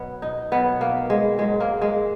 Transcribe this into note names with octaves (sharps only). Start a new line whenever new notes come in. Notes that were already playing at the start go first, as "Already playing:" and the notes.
Already playing: B2 F#3 B3
D#4
B2 F#3 B3
A#3
G#3
G#2 F#3 G#3
A#3
G#3